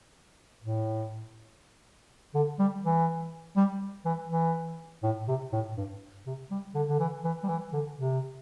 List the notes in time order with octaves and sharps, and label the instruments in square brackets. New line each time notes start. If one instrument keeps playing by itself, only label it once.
[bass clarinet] A2
D3
G3
E3
G3
E3
E3
A2
C3
A2
G2
C3
G3
D3
D3
E3
E3
G3
E3
D3
C3